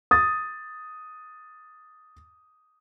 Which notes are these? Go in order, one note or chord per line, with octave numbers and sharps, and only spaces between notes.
D#6 A6